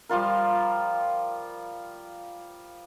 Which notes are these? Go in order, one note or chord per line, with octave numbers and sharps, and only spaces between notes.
F3 G3 F4 A#4